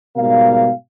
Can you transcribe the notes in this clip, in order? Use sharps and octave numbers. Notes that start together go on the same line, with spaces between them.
G#2 B2 G3 A#4 F5